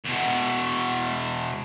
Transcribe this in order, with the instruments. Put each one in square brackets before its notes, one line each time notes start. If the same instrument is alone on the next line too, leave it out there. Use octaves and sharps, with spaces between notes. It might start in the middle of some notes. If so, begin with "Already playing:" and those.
[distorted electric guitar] E2 B2